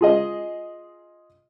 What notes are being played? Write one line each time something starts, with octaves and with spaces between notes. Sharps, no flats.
F4 G#4 D#5